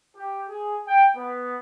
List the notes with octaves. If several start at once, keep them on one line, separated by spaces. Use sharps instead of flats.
G4
G#4
G5
B3